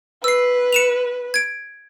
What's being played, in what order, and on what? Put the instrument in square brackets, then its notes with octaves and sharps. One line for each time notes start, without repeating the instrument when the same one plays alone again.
[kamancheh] B4 [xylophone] E6 C7
[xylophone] C#7 E7 F7
G#6 D7